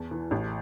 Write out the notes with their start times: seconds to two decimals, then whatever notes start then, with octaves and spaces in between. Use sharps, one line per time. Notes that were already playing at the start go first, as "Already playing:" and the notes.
Already playing: E2 A5
0.11 E3
0.31 A1